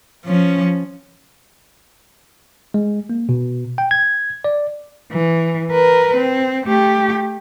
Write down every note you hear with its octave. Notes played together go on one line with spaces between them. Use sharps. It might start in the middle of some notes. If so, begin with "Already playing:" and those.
F3 C#4
G#3
A#3
B2
G5
G#6
D5
E3
A#4 B4
C4
A3 G4